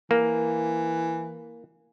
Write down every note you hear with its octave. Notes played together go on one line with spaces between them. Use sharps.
E3 A#3